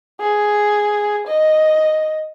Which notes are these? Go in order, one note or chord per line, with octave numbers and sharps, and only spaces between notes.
G#4
D#5